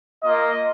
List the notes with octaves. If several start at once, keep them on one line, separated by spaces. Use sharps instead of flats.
A#3 F4 D#5